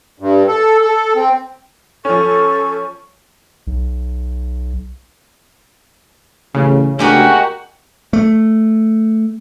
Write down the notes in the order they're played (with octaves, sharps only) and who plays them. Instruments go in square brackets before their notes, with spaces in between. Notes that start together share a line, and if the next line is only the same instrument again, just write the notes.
[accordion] G2
A4
A4
C4
[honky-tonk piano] F3 C#4 [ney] A4 [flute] C#6
[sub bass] B1
[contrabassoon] A1 [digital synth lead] C#3
[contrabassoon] D2 [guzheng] G#3 G4 A#4 [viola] F#4
[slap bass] A3